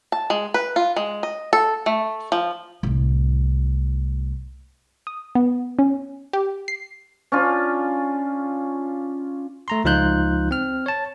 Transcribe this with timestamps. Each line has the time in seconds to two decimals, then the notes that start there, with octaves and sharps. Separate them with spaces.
0.12 A5
0.30 G#3
0.54 B4
0.76 F4
0.96 G#3
1.23 D#5
1.53 A4
1.86 A3
2.32 F3
2.83 C2 A2
5.07 D#6
5.35 B3
5.79 C#4
6.33 G4
6.68 C7
7.32 C#4 D4 F4
9.68 A3 A#5 C6
9.84 C#2 F3 D#4 F4 F#6 G6
10.51 C4 F6
10.86 C#5 A5